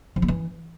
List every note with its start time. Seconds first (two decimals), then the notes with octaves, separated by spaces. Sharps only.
0.16 F3
0.22 A#3
0.28 E3